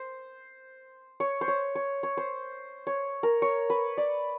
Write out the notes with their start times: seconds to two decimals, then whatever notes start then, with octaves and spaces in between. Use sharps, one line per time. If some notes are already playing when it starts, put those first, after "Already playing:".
Already playing: C5
1.20 C#5
1.41 C5
1.48 C#5
1.75 C#5
2.03 C#5
2.17 C5
2.87 C#5
3.23 A#4
3.42 C#5
3.70 B4
3.98 D5